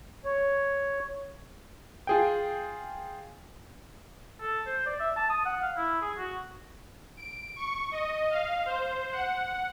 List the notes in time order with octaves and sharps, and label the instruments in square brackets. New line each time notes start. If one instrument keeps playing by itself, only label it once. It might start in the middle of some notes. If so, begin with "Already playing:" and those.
[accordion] C#5
[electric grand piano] F4 G#4 G5
[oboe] A4
C5
D5
E5
A5
D#6
F#5
F5
E4
G#4
F#4
[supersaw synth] D7
C#6
D#5
F5
C5
F#5